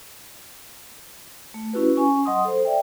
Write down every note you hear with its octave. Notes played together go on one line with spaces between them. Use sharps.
A3
C#4 E4 F#4 G4 B4
C#4 G#5 C#6
F#3 D#5 F#5 C6 D#6
A4 C5
D5 E5 G5